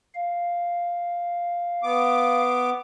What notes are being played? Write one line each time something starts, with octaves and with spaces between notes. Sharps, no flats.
F5
B3 D6